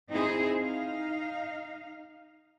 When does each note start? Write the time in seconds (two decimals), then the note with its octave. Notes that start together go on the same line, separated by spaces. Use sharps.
0.11 C4 D#4 E4 G#4 C5
0.61 D#4 F5